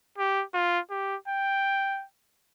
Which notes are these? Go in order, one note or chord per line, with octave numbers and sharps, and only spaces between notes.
G4
F4
G4
G5